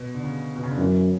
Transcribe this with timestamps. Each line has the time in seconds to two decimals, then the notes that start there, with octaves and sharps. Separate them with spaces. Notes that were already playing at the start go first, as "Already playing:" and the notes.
Already playing: B2
0.14 D3
0.24 C#3
0.56 B2
0.63 C#3
0.71 D3
0.77 F#2 E3